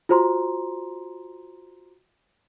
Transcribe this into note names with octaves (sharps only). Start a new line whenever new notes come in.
F4 F#4 C5 A#5 C6